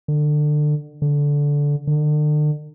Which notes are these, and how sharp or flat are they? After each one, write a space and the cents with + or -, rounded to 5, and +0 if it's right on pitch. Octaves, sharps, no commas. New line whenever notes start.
D3 +25
D3 -15
D3 +40